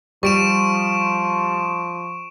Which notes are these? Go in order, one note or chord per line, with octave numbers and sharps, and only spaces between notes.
F3 G3 C#6 D7 E7